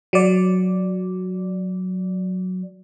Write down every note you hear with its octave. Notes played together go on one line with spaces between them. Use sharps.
F#3 D5